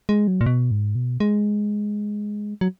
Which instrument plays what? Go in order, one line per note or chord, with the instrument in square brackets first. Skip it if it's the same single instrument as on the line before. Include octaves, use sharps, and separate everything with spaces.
[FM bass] G#3
F#3
A#2
B2
G#2
B2
G#3
F#3